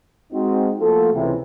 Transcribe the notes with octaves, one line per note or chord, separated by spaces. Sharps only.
G#3 C4 D#4 F#4
F3 A3 A#3 F4 F#4 A4
C#2 C3 E3